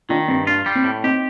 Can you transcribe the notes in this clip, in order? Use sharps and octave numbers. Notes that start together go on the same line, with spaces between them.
D#3 D4 F4
G2 C4
D4 F4
G3
C4
A2
C4 D#4 G4